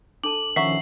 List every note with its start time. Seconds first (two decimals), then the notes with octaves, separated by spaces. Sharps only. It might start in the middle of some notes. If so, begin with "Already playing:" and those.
0.24 D4 A4 A5 D6 F#7
0.56 D#3 F3 C#4 E5 F#5 A#5 C#6 C7